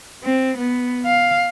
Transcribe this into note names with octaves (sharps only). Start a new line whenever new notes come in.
C4
B3
F5